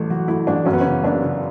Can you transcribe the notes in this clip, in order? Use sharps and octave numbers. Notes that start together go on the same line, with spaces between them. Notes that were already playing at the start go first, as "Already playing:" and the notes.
Already playing: A1 G2 A3
F#3 F#4
A3 E4
A1 D4
F#2 C#4
B3
C#3 C#4
F#1 D4
C#3